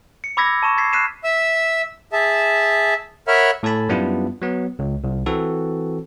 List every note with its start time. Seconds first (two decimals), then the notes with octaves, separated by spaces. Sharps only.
0.24 C#7
0.37 B5 D6 E6 G#6 A#6 B6
0.63 A5 C#6 E7
0.77 E6 G#6 A6 B6 C7
0.93 F6 F#6 B6 C7 D#7 E7
1.24 E5 E6
2.13 G#4 E5 A5
3.28 A#4 C#5 E5 F#5 B5 F6
3.63 A2 A4 G#5 A5 B5
3.89 F#2 G3 B3 D4 E4 F4
4.42 F#3 B3
4.79 C#2
5.04 C2
5.26 E3 C4 F#4 A4